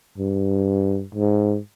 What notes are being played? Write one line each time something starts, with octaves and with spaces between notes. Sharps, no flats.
G2
G#2